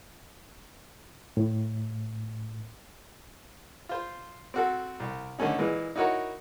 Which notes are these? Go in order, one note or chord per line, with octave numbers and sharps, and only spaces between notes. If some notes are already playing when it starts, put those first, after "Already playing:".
A2
F4 C5
C4 F#4 A4
C2
D3 D#3 A3 C#4 D#4
A#2 E3 G#3
D#4 E4 F#4 A#4 C#5